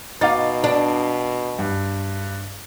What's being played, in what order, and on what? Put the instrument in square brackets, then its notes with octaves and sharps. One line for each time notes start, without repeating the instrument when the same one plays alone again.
[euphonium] B2 [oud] D#4 [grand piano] F5 D6 A6
[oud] D4
[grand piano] G2